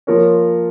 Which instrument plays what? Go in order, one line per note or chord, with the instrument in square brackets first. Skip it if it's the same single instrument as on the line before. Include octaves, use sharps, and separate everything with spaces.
[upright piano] F3 A#3 F4 A#4 C#5